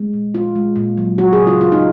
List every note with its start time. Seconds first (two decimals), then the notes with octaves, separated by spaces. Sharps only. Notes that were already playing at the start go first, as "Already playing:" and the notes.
Already playing: G#3
0.13 A#2
0.34 A#2 F4
0.56 G#3
0.76 A#2
0.98 F#3
1.18 F#3 F#4
1.33 G#4
1.40 C#3
1.47 F4
1.61 A#2 F4
1.72 D#4